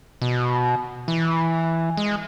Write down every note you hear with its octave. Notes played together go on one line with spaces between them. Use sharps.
B2
E3
G#3